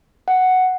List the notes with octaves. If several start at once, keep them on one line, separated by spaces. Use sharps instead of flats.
F#5